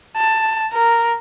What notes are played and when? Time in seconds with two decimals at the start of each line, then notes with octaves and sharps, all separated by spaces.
0.17 A5
0.73 A#4